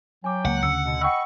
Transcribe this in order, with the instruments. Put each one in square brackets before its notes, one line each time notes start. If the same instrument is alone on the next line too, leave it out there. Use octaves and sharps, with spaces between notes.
[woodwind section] F#3 G5 [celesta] G#5 D6
[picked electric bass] C#2 A#3 [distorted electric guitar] F#5
[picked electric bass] D2 C#3 [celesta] E6 C#7
[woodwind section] B2 D3
[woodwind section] D#5 B5 C#6 [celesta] F#5 G5 E6